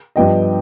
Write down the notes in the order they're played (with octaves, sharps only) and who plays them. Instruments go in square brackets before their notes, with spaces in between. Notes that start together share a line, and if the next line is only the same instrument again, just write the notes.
[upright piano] G2 F3 B3 D#5 G5